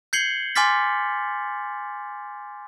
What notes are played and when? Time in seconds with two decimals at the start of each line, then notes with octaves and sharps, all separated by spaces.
0.13 G6 G#6 C7 C#7 F#7 G7
0.56 G#5 C6 D6 F6 A6 B6